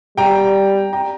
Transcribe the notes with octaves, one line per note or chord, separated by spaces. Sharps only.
G3 G5 A#5
G5 A#5